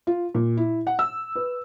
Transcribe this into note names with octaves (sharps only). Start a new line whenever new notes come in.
F4
A#2
E4
F#5
E6
B4